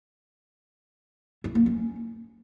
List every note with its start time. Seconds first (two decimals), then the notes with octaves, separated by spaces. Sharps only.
1.44 E4
1.55 A#3
1.66 C#4